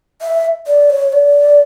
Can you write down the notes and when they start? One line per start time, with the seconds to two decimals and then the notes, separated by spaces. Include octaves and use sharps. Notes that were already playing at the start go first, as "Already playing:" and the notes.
0.22 E5
0.67 D5
0.90 C#5
1.13 D5